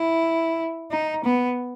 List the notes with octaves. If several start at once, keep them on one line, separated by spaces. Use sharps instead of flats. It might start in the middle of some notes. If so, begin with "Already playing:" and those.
Already playing: E4
D#4
B3